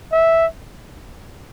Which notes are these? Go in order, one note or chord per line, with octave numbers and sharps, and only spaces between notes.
E5